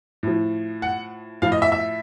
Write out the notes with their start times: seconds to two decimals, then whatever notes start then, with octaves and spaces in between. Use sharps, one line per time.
0.23 A2 F3
0.82 F#5
1.42 A2 F3 F5
1.52 D#5
1.62 E5
1.72 E5